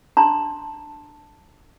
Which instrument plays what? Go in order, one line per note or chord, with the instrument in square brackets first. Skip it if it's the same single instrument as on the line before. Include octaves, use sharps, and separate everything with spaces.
[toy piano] D4 A5 A#5 C6